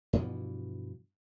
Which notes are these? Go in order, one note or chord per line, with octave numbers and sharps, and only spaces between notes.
G2 B2 E3 F3